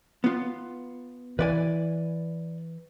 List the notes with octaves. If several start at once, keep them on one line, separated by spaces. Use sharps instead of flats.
B3 F4
E3 B4 D5 G#5